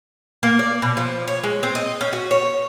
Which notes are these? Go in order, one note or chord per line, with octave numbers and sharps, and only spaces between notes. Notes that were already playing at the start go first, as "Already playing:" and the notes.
A#3
D5
B2
F3
C#5
G#3
C4
D#5
C#4
F#4
C#5